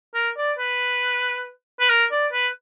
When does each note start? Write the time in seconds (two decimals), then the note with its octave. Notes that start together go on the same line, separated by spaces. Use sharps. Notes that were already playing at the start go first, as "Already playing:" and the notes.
0.15 A#4
0.37 D5
0.59 B4
1.80 B4
1.90 A#4
2.12 D5
2.33 B4